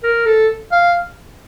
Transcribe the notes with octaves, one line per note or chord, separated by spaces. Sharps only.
A#4
A4
F5